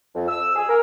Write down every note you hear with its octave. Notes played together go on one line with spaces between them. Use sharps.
F2
E6
G#4
A#4